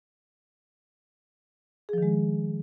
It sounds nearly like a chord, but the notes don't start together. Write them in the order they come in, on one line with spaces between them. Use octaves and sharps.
G#4 F3 D#3 G#3